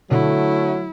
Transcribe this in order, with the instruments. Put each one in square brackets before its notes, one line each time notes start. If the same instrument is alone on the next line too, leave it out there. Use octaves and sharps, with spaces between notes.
[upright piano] D3 [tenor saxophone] F#3 [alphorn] A3 [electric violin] E4